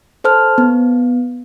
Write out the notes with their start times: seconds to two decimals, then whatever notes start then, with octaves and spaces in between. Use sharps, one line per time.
0.24 A4 C5 A5 F6
0.58 B3